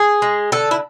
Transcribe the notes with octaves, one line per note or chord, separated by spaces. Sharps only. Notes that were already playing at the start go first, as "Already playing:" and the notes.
Already playing: G#4
G#3
D3 A4
E4